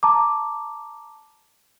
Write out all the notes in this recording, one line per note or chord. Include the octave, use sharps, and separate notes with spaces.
A5 A#5 D6